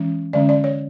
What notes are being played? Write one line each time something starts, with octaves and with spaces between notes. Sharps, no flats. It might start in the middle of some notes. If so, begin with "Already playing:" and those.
Already playing: E3 G#3 C#4
D3 G#3 C#4 D5
D5
C#5